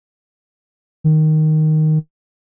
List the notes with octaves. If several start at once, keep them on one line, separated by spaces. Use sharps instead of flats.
D#3